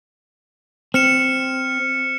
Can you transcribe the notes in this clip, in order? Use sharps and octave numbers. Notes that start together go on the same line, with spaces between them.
C4 F6 C#7 E7